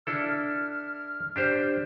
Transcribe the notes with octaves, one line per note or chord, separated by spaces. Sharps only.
D4 E4 A4 F6
D4 G4 C5